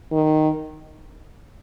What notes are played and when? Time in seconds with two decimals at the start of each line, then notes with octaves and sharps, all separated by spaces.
0.12 D#3